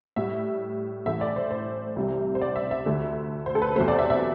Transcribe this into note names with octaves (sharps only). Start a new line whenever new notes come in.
A2 G3 E5
A2 E3 A3 E5
D5
C5
C5
C2 C3 G3
C5
D5
E5
E5
D2 D3 A3
C5
A4
B4
E2 C3 F#3 A3 C5
D5
E5
E5